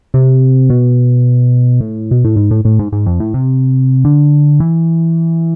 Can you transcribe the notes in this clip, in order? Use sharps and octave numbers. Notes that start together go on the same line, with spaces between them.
C3
B2
A2
B2
A2
G#2
A2
A2
G#2
G#2
F2
A2
C3
D3
E3